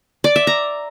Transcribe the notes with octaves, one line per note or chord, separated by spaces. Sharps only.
D5
E5
A#5